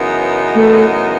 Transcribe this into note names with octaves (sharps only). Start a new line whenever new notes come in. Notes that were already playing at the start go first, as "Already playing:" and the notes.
Already playing: F#2 C#3 E3 B3 D#4
A3